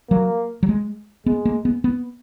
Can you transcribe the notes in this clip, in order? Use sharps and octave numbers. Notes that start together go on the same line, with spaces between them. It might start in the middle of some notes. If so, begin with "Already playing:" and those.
F#3 A#3
F#3
G#3
G#3 B3
A#3
B3
B3